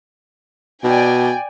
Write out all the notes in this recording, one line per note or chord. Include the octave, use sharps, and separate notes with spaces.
B2 D5 G5 G#5